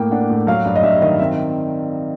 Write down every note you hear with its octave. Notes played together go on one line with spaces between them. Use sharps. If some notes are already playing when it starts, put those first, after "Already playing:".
Already playing: A2 A#3 G5
D4 F#5
A2
F#3 F5
G2
D#5
G2 E5
D#3 D#5
C4 E5